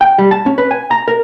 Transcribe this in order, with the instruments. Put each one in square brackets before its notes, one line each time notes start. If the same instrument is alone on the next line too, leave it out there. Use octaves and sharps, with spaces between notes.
[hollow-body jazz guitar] G5
G3
A5
C#4
B4
G#5
A#5
A#4